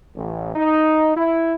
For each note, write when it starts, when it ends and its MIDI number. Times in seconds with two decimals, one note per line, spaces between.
0.16 0.51 33
0.55 1.12 63
1.16 1.54 64